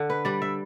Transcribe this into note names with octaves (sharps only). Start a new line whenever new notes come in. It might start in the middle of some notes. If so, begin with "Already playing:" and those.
Already playing: D3
B4
G3 D5
E5